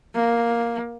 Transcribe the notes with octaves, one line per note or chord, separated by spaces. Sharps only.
A#3